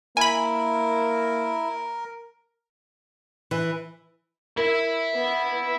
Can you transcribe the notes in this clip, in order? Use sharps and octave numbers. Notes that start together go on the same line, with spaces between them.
A#3 E4 A#4 G#5 B5
E3
A#4 E5 B5
B3